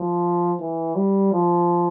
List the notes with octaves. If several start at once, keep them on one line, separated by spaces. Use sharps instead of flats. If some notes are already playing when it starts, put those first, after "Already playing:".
Already playing: F3
E3
G3
F3